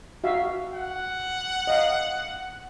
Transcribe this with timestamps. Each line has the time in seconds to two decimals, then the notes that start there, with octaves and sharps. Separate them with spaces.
0.24 F#4 E5 F5
0.74 F#5
1.67 D#5 F5